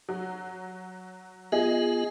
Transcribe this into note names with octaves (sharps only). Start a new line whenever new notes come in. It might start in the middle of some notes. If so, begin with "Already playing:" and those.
F#3
B3 F4 G#4 D#5